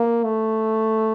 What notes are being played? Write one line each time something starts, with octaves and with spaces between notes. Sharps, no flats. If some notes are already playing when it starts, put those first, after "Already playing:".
Already playing: A#3
A3